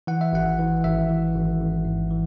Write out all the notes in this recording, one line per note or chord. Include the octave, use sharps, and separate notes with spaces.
E3 F#5
E5
G#1 F#5
E3
G#1 E5
E3
G#1
G#1
G#2
E3